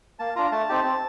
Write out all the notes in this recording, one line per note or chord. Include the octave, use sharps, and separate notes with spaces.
A#3 A5
D4 F4 A#5
A3 A5
C4 D#4 G4
C4